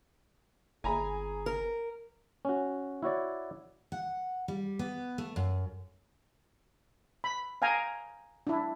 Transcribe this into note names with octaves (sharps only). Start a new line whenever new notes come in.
G1 G#4 G#5 A#5 B5
A#4
C#4 F#4
E4 F#4 C#5 D5
F#5
G3
B3
A3
F#2
B5
F5 G5 G#5 A#5
D4 E4